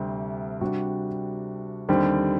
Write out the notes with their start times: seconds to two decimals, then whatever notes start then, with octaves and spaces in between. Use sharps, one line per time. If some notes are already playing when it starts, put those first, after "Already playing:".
Already playing: D2 C3 G3 C4
0.61 C3 G3 D4 F#4
1.89 D#2 D3 G3 C4